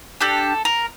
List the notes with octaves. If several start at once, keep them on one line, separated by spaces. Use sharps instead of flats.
D4 G4 A4
A#4